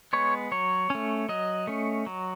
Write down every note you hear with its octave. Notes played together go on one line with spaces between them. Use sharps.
G#3 B3 C#5
F#3 C#5
A3 C#4
F#3 D#5
A3 C#4
F#3